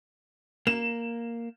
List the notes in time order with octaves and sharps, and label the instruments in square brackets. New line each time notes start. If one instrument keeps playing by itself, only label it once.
[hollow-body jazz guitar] A#3 [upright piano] E7